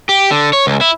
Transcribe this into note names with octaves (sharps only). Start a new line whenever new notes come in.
G4
D3
C#5
C#2
E4